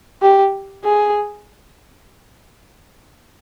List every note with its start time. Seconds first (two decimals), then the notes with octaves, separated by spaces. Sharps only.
0.22 G4
0.84 G#4